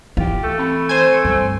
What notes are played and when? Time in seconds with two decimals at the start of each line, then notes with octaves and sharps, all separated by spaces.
0.17 E3 F4 G4
0.44 A3
0.59 C4 A5 B5
0.89 C5 G#5
1.25 G2 D3